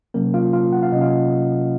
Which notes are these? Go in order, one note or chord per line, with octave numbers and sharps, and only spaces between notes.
C3 F#3 A#3 C#4 A#4
F4 F5
F4 F5
F#5
F5
C3 F#3 C#4 D#5
F4 F5